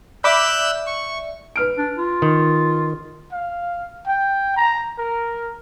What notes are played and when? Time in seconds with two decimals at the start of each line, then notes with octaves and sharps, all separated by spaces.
0.24 D5 E5 B5 D6 E6 F#6 G6
0.87 C#6
1.56 B4 F6 D7
1.77 D4
1.96 F4
2.22 D#3
3.32 F5
4.07 G5
4.56 A#5
4.99 A#4